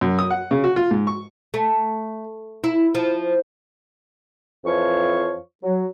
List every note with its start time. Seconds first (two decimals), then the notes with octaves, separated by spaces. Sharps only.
0.01 F#2
0.19 D#6
0.30 F#5
0.51 C#3
0.64 F#4
0.76 F4
0.91 G#2
1.07 C#6
1.54 A3
2.64 E4
2.95 F3
4.65 F2 E3 F3 C#5 F5 C#6
5.62 F#3